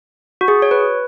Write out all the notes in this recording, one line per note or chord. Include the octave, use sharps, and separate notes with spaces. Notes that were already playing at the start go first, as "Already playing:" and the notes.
F#4
G#4
C#5
B4